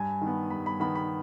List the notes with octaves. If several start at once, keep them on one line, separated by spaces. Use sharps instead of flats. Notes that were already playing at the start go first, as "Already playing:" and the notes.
Already playing: G2 G#5
D#3
B3
G2 B5
B5
D#3 B3 B5
B5